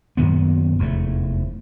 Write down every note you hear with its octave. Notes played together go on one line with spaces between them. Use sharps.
F#2 A#2 D#3 B3
F1 E2 C3 A3